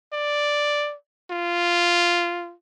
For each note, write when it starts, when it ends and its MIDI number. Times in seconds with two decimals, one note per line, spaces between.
0.13 0.95 74
1.31 2.54 65